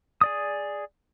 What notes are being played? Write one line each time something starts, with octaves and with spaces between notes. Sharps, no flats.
G#4 D5 D#6